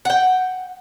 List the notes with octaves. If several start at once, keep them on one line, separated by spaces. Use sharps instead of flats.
F#5 G5